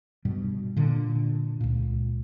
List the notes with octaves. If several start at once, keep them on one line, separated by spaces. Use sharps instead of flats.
G2 B2 G3
A#2 D3
C#2 A#2